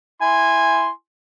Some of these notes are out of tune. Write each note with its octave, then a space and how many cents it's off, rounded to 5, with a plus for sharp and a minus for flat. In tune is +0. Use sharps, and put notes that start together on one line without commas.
E4 +5 G#5 -10 C6 -5